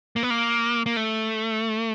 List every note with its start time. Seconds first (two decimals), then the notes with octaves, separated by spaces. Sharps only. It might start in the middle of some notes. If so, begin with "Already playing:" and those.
0.16 A#3
0.23 B3
0.30 A#3
0.86 A#3
0.97 A3